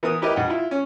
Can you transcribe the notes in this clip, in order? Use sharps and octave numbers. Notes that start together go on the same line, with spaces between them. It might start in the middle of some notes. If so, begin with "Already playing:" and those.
E3 B3 A#4 D#6
E4 G4 A#4 B4 D#5
G2 D#5 F#5 G5
E4 F4
C#4